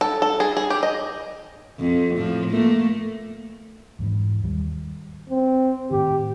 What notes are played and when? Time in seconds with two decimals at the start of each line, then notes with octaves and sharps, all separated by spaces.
0.01 A4
0.22 A4
0.40 G#4
0.57 G#4
0.70 G4
0.83 D#5
1.79 F2
2.16 A2 F3
2.49 A3 A#3
3.99 E2 G#2 E3
4.43 D#2 G3
5.30 C4
5.91 A2 D#3 G4